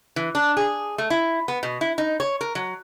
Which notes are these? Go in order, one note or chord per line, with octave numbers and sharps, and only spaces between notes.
E3
D4
G#4
A3
E4
B3
B2
E4
D#4
C#5
A#4
F#3